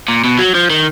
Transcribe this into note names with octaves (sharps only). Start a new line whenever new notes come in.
A#2
B2
F#3
F3
D#3